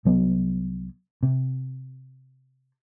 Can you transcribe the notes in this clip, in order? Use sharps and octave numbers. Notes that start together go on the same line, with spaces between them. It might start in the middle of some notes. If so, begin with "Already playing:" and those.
C2 F#3 B3
C3